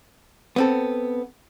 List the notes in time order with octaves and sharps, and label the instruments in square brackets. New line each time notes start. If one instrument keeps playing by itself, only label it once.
[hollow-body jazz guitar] B3 C4 A4